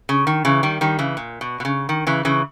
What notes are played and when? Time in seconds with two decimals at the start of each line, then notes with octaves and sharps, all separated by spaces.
0.09 C#3
0.27 D#3
0.45 C#3 E3
0.63 D#3 G3
0.81 D#3 G3
0.99 C#3 E3
1.17 A#2
1.41 B2
1.60 B2
1.65 C#3
1.89 D#3
2.07 C#3 E3
2.25 C#3 E3